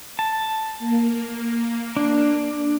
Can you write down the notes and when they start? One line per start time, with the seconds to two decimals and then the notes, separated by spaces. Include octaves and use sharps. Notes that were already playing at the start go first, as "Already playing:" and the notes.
0.19 A5
0.79 A#3
1.97 D4